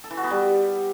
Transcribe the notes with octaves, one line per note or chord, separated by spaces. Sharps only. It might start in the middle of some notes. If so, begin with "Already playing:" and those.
A4
E3
F#4
B3
G3